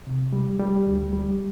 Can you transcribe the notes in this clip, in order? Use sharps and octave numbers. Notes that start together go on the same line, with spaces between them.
C3
G3
G3
D2
G3